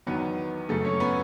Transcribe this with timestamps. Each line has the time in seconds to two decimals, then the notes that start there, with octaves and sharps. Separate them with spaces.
0.07 E2 D#3 F#3 B3 B4
0.69 F#2 C#3 F#3 A3 A4
0.85 C#4 C#5
1.00 B3 B4